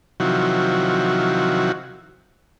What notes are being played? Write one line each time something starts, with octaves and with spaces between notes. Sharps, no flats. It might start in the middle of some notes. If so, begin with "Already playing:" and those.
C3 D#3 F3 F#3 E4 F#4